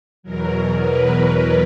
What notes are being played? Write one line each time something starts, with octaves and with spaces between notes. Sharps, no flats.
E2 B2 F#3 A#4
B4